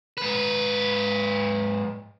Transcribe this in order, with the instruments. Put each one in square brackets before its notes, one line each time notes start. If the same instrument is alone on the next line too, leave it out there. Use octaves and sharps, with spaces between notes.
[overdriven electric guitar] G#2 B4